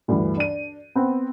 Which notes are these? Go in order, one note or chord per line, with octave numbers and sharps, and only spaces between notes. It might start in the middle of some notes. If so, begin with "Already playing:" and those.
D2 G2 E3
D4 D#7
B3 C4